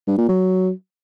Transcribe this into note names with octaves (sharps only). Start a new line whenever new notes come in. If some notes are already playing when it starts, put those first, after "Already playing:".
G2
A#2
F#3